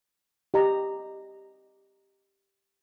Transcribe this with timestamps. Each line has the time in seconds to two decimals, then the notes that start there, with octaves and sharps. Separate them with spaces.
0.54 G4 D#5 A#5